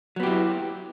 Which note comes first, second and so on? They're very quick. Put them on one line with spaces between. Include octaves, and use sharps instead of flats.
F#3 B3 G4 E4